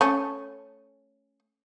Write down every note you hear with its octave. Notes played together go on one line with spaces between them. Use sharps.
A3 C#4